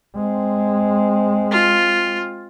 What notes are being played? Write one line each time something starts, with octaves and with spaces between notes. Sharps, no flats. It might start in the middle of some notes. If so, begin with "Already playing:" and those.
G#3 C4
F4